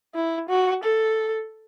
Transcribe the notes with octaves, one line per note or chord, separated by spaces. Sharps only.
E4
F#4
A4